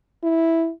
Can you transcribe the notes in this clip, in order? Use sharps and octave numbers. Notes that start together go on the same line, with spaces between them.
E4